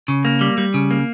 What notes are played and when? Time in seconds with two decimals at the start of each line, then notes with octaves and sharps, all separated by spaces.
0.08 C#3
0.25 A#3
0.41 G3
0.58 G3
0.74 C#3
0.91 A#3